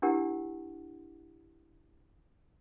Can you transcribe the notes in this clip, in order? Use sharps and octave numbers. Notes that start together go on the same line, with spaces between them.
D4 E4 G4 A#4 F#5